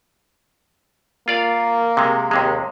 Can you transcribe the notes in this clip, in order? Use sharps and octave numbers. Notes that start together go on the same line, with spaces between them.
A#3 F4 D5 F5
C3 G#3
D#2 C3 G#3